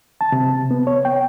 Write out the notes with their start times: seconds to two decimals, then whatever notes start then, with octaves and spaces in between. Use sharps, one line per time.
0.21 A5
0.32 C3
0.71 B3
0.87 C#5
1.05 G5